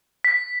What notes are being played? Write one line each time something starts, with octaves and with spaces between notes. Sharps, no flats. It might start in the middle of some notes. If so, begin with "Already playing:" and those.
B6